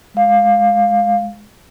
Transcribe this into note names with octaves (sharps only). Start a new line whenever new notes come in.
G#3 F5